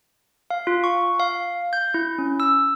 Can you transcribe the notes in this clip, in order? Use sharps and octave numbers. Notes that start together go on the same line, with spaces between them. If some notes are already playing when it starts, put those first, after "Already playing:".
F5
F4
C#6
F5
G6
E4
C#4
E6